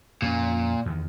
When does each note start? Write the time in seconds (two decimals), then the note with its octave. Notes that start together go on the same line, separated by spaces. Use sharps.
0.22 F2 A#2 C#4
0.86 E2 D#3